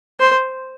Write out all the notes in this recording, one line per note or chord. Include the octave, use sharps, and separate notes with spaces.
C5